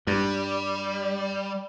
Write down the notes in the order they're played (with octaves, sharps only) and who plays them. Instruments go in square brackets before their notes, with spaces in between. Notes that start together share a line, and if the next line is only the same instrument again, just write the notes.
[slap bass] G2 [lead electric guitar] G3